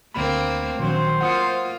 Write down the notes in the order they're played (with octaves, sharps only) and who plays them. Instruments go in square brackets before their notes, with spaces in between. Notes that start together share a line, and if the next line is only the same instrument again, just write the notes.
[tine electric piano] D2 B5 [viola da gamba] A3 A#3 C4
[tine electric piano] A#1 D#3 [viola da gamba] F#3 C4 [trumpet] C5
[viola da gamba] A#3 F4 [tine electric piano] F#5 D#6 C#7